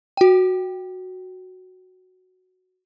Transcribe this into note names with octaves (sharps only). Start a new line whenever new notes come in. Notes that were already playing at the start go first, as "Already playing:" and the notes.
F#4 G5